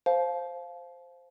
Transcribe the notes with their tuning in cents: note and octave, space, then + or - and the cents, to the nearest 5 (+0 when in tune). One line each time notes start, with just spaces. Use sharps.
C5 +0 F5 +0 A5 -35